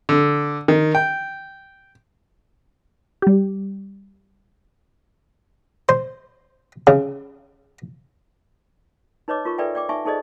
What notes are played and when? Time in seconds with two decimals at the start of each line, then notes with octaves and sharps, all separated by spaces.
0.09 D3
0.68 D#3
0.95 G5
3.22 G3 G4
5.89 C5
6.87 C#3
9.28 D#4 B4 C#5 D#5 D6
9.45 F4 A#4 C#6
9.58 A4 B4 D5 E5 G5 G#5
9.75 D5 G5 D6
9.89 D#4 E5 G#5 C#6
10.05 D#4 G#4 A4 C5 D5 D#5